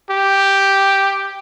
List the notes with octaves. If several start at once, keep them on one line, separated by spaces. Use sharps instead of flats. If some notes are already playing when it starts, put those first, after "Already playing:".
G4